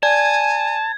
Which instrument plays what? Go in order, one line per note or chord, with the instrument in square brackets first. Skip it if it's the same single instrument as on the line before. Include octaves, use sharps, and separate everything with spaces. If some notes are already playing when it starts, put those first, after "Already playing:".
[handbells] D5 [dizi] G#5 [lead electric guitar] A5 [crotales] G#6